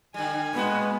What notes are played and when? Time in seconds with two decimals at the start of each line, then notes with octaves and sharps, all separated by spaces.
0.14 D3 G3 G#5
0.53 A2 G#3 B3 F#4